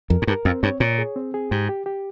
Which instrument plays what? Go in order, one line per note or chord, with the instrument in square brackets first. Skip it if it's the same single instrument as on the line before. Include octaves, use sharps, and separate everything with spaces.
[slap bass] F2 [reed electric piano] A#4
[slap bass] G#2
[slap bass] G2 [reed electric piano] A#4
[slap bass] F2 [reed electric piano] C4
[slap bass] G2 [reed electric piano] C#5
[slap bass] A#2 [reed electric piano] C#5
[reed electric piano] G#4
C4
G#4
[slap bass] G#2 [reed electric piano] G4
[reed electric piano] G4
G4